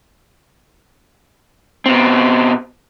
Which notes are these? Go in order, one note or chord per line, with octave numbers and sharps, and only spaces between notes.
B2 C4